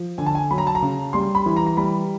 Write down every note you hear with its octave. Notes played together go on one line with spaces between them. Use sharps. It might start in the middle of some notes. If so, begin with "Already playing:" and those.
Already playing: F3
D3 G#5
A5
G#5
F#3 B5
A#5
A5
A#5
C#3
G3 C6
B5
E3
A#5
A#5
G3 B5